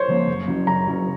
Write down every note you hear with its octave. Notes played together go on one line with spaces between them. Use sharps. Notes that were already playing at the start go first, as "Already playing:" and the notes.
Already playing: C5 C#5
C#3 F3 A#3
F#2
C#3 F#3
F#2 A#5
C#3 F#3